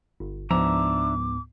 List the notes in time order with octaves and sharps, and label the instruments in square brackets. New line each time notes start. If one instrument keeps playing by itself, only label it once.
[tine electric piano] G1
[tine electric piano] C#2 G#2 B3 [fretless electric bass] F3 [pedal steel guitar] D4 E5 A#5 [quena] D6